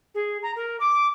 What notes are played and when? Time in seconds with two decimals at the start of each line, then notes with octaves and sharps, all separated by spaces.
0.14 G#4
0.42 A#5
0.55 A#4
0.80 D6